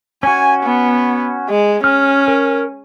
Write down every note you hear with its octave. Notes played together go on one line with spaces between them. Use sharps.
C#4 F#4 G#5
B3
G#3
C#4 F6
A#4